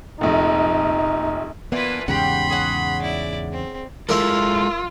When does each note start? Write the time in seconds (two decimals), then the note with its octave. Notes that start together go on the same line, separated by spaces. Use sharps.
0.21 F1 A#1 D#4
1.72 E3 A#3 B3 D4 F4 B4
2.08 E2 G#2 C#3 G4 F#5 B5 C6
2.50 G#4 C#5 F#5
3.02 E4 D5
3.52 C4
4.09 G#3 E4 F4 A4 A#4 D5 E5